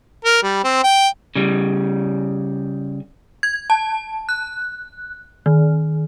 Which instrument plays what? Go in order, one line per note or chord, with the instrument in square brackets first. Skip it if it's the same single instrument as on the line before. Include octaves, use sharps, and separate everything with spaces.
[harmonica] A#4
G3
C4
G5
[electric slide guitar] C#3 G3
[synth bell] G#6
A5
F#6
D#3